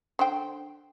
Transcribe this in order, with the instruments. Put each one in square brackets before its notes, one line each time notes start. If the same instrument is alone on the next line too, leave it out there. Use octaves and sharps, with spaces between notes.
[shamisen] D3 C5 G5